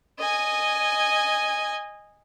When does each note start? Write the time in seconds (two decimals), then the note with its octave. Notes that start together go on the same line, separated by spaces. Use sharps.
0.19 D#5 G#5